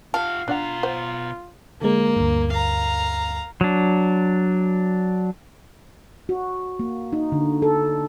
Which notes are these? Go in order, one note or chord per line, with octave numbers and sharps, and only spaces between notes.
F4 G4 F5 A5
B2 D4 F4 D5 F#5 A#5
C5 F#5
D3 G#3 A#3
D2 G2
F5 A#5
F#3 D4
F#4
A#3
D#4
D3
A4